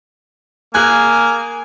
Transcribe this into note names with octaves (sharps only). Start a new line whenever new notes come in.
A#3 G#4 G#5 F#6